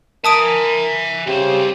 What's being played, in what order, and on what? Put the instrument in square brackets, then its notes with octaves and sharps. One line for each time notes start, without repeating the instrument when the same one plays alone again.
[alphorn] A#4 [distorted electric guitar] E5 G#5 [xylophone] A5 D#6 D7
[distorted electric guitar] C2 C5 [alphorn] C#3 [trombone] G4